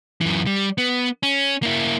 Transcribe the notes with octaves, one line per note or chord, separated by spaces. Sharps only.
F#2 E3
G3
B3
C#4
A#3 E4